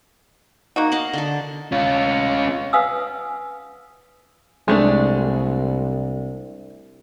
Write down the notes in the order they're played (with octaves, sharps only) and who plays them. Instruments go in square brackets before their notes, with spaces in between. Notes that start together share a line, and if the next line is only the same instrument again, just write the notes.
[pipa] A#3 D#4 F#4
[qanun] D#5 F5 F#5
D3 A4
[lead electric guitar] C#4 F4
[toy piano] B4 F5 F#5 G#5 D#6 E6
[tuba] C2 [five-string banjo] G#3 A3 D4